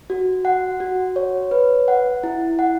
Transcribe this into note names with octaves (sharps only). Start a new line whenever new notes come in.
F#4
F#5
F#4
C#5
B4
F#5
E4
F#5